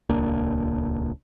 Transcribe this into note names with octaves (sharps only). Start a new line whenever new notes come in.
D#1 C#2 A#3 D4